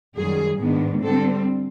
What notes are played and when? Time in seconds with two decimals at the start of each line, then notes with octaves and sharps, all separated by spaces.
0.16 F#2 D#3 G3 G#4
0.59 G#2 D#3 G#3 B3 D4
1.02 D3 G3 C4 A4